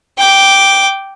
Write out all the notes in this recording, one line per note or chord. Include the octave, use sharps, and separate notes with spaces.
G5 D6